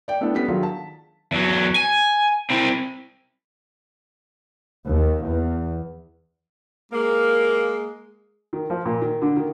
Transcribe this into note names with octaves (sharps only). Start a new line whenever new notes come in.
D5 G5
A3 B3 D4 E4 A4
G3 B3 C#4 B6
D#3 F#3 D4 F4 G#4
A5
E2 F#3
G#5
C4 E4
D#2
E2
G#3 A#3
D#3
F3
A#2
D#3
D3
D#3